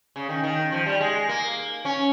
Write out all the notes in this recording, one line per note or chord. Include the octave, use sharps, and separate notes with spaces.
C#3
D#3
D#3
F3
G3
G#3
A#3
C#4